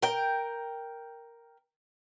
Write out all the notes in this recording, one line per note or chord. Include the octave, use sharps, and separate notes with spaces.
A#4 G5